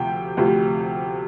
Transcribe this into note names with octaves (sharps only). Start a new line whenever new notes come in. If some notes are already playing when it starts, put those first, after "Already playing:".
Already playing: D2 C3 F3 G5
D2 C3 F3